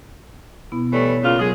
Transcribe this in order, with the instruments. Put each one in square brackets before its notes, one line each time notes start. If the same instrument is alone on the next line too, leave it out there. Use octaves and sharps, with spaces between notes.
[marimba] B2 B3 E4
[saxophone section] E3 G3 A3 [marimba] C#5
[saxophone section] C#3 A#3 F4
[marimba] F#3 A#4 [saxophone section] G#3 G#4